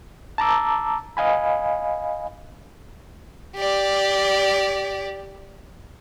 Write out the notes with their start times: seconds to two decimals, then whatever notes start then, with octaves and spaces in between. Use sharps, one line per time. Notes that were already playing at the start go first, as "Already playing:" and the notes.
0.38 A5 A#5 D6 E6
1.17 D#5 F5 G#5 B5
3.56 G4 D5